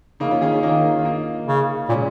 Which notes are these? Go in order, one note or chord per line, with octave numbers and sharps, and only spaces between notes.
C#3 A#3 D#4
C#4 F4
D#3 D#4 G#4
C#4 F4
D#3 A#3 D#4
F4
A#3 D#4
C#3
A#2 G#3 C#4